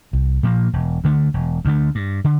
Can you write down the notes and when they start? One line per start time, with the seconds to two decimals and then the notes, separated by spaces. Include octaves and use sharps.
0.13 C2
0.43 A#2 F3 A#3
0.73 E1
1.04 D2 D3 A3
1.34 E1
1.65 D2 D3 A3
1.95 G2
2.24 D3